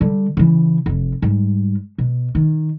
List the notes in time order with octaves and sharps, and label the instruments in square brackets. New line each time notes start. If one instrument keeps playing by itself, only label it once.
[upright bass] D3 G3
C#3 E3
F1 F2
G#2 G3
B2
D#3